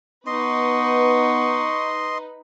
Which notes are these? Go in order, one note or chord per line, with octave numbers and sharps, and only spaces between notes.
B3 D#4 B4 D#5 C6 C#6